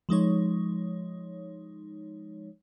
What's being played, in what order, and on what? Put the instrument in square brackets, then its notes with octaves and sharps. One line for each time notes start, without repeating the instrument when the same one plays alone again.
[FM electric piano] F3 G#3 D#4 C#5